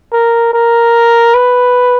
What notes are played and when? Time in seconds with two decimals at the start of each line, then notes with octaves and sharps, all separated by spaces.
0.13 A#4
0.53 A#4
1.34 B4